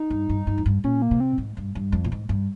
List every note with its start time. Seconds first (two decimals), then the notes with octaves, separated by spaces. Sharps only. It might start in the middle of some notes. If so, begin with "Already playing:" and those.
Already playing: D#4
0.10 G2
0.29 G2
0.47 G2
0.58 F2
0.66 G2
0.84 A#2 C#4
1.02 A#3
1.11 C3
1.20 C4
1.38 G#2
1.57 G2
1.75 G2
1.92 F2
2.04 A#2
2.12 G#2
2.29 G2